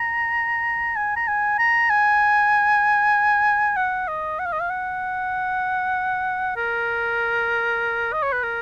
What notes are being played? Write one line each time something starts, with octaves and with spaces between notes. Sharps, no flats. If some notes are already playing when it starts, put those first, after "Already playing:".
Already playing: A#5
G#5
A#5
G#5
A#5
G#5
F#5
D#5
F#5
F5
D#5
F5
F#5
A#4
D#5
C#5
B4
A#4